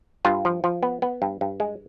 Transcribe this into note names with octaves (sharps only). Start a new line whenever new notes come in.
G2 F4
F3
F3
B3
B3
G2
G2
G#3